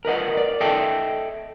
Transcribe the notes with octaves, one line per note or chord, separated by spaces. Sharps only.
A#4 B4 D#5 F#5
D5
A4 D#5 E5 G5 A5